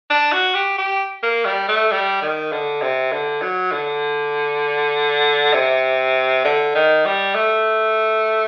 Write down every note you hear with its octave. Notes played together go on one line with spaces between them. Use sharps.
D4
F#4
G4
G4
A#3
G3
A3
G3
D#3
D3
C3
D3
F#3
D3
C3
D3
D#3
G3
A3